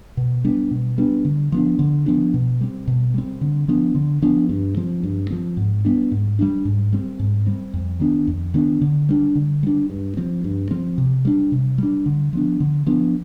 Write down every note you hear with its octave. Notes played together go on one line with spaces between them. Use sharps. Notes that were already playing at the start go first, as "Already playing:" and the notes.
B2
G3 B3 D4
B2
G3 B3 D4
D3
F3 B3 D4
D3
F3 B3 D4
B2
G3 C4
B2
G3 C4
D3
F3 B3 D4
D3
F3 B3 D4
G2
F3 C4
G2
F3 C4
G#2
G3 B3 D4
G#2
G3 B3 D4
G#2
G3 C4
G#2
G3 C4
F2
D#3 B3 D4
F2
D#3 B3 D4
D3
G3 D4
D3
G3 D4
G2
F3 C4
G2
F3 C4
C3
G3 D4
C3
G3 D4
D3
F3 B3 D4
D3
F3 B3 D4